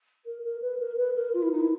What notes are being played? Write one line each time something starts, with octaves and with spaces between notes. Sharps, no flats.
A#4
A#4
B4
A#4
B4
A#4
F4
E4
D#4
E4